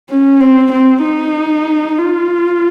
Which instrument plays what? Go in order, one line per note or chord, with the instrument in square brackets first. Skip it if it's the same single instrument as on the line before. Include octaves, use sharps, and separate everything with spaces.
[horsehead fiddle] C#4
C4
C4
D#4
F4